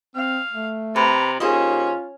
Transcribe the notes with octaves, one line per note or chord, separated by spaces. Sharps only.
C4 F5
A3
C3 B4 A#5
D#2 C#4 F4 G#4 C5 D#5